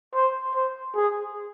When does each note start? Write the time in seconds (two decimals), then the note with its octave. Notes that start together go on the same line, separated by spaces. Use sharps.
0.14 C5
0.55 C5
0.95 G#4